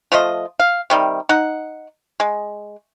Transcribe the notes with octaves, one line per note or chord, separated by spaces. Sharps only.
F3 A3 F4 D#5
F5
C3 D#3 G3
D#4 F#5
G#3